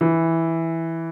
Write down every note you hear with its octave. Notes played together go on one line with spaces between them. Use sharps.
E3